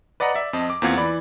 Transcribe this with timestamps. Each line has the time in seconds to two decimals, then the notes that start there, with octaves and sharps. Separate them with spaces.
0.20 B4 D5 D#5 F#5 A#5
0.35 D5 E5
0.53 F2 C4 D#5 A5
0.70 D6
0.82 E2 A#3 C4 F4 F#5 G#6
0.97 E3 D5 B5